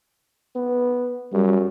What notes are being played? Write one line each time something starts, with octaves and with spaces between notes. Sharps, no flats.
B3
F#2 G3